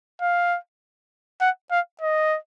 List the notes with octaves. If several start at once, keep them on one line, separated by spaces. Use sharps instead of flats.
F5
F#5
F5
D#5